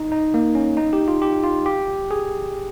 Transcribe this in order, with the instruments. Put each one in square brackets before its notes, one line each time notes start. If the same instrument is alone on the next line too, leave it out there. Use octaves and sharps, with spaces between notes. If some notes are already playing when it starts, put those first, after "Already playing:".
Already playing: [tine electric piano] D#4
D#4
A#3
C#4
D#4
G4
F4
G4
F4
G4
G#4